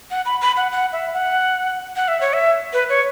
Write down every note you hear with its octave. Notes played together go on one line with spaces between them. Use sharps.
F#5
B5
B5
F#5
F#5
E5
F#5
F#5
E5
C#5
E5
B4
C#5